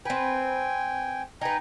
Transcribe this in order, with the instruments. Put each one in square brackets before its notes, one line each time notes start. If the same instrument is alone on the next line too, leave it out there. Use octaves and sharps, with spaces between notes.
[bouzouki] C4 B4 [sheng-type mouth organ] G5 G#5
[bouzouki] D#4 B4 [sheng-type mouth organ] G5 G#5 A#5